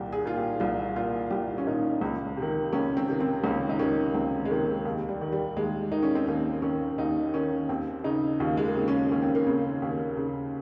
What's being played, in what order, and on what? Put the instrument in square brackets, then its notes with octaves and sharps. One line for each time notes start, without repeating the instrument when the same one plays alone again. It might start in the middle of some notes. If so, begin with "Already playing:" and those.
Already playing: [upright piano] C2 A#2 G4
G#4
A#2 F4
G4
C2 F4
A#2 F4
C2 G4
C#4
A#2 D#4
C#2
C3 D#3
C#2 C#4
C4
C3 D#3
C4
C#2 C#4
D#4
C3 D#3 C#4
C#2 C4
G#3
C3 D#3 A#3
D#2
G3
D#3
G3
D#2 G#3
D#3 D#4
C#4
C4
D#2 A#3
D#3 C#4
D#2 D#4
D#3 C#4
D#2 C4
C#3 D#4
D#2 F4
G#3
A#3
C#3 C4
C#4
D#2 C#4
C4
A#3
C#3 C4
D#2
C#3